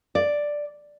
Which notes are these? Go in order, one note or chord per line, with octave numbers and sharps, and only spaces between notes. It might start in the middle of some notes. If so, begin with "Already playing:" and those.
D5